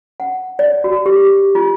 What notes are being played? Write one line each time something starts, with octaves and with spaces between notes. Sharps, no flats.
F#5
D5
F#4
G4
F4